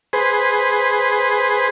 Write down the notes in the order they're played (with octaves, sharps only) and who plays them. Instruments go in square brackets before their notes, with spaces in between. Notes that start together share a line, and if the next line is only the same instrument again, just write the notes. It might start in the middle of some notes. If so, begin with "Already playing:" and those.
[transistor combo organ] G#4 B4 C5